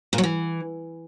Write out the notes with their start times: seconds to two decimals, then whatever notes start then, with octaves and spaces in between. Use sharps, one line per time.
0.13 A#2
0.18 F#3
0.24 E3